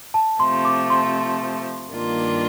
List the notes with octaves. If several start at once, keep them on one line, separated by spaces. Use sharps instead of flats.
A5
C3 F3 A3 C6
D6
C6
G2 D#3 A#3 D4 F4